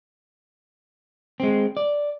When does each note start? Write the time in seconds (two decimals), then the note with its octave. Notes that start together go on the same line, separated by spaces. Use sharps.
1.40 G#3 C4
1.77 D5